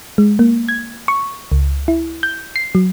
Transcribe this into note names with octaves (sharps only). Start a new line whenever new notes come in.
G#3
A#3
G#6
C#6
C#2
E4
G6
C7
F#3